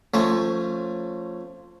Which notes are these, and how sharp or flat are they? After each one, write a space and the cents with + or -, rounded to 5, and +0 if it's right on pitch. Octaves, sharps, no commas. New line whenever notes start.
F3 +0 A3 +25 C#4 -5